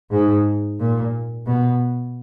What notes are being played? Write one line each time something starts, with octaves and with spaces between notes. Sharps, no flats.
G#2
A#2
B2